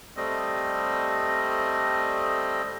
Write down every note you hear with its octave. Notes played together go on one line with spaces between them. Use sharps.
G3 A3 C4 D#5